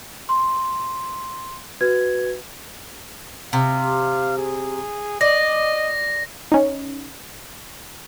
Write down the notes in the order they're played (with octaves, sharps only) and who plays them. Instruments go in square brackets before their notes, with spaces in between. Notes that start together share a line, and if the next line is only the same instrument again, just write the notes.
[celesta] C6
F#4 B4 G#6
[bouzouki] C3 [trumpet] F5
[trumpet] G#4
[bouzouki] D5 [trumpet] D#5 [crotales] A#6
[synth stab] C#4 D#4